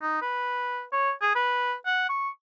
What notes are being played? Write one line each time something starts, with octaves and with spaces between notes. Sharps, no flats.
D#4
B4
C#5
G#4
B4
F#5
C#6